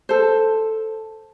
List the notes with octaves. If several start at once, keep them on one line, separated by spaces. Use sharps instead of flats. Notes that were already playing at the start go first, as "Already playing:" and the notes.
A4 C5